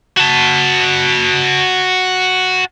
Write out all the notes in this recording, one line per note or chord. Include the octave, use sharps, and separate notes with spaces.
F#4 A5